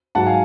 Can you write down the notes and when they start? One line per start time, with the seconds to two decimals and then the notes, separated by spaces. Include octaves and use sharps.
0.15 G#2 F#3 F#5 A5
0.27 F5 G#5